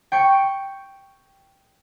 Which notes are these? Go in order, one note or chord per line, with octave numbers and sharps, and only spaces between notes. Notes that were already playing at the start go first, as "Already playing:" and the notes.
G5 C#6 C#7